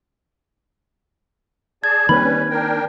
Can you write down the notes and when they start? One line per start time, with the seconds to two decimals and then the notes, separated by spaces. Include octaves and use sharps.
1.84 G#4 D5 A5 G#6
2.09 D#3 G3 A#3 C4 C#4 B4 B5
2.50 D4 A#4 G5